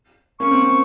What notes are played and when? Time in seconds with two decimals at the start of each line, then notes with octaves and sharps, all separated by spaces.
0.39 A#3 C#4 C#6
0.51 C4
0.63 C4